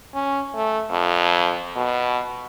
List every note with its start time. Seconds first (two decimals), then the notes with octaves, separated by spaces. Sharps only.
0.15 C#4
0.55 A3
0.91 F2
1.76 B2